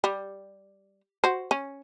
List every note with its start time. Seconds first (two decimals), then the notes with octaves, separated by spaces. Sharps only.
0.04 G3
1.24 F#4 C5
1.51 C#4